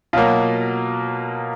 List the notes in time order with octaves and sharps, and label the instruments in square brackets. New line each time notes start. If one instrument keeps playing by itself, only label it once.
[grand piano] B2 F#3 A#3 F4